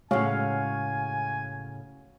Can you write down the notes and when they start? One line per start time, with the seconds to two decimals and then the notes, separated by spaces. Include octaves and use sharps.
0.11 A2 C#3 G#3 F#4 C#5 F5 G#5